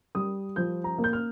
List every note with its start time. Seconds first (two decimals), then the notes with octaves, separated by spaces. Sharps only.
0.15 G3 D#6
0.56 F3 G6
0.84 A#5
0.98 A#3
1.04 G6
1.13 F6